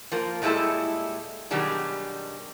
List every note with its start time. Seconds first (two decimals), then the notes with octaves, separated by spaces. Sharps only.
0.12 F3 A#3
0.42 A#2 G3 G#3 E4 A4 A5
1.51 B2 D#3 F#3 G3 D4 G#4